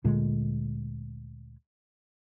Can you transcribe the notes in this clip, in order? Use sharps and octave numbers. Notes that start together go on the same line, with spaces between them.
D2 A#2 D3 G#3